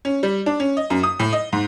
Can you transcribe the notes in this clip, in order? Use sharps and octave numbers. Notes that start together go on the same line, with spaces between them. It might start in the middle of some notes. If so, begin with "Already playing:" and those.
C#4
G3
D4
C#4
D#5
F#2
D#6
A2
D#5
G#2